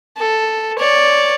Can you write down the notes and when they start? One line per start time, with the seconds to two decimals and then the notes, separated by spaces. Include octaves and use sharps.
0.18 A4
0.79 C#5 D5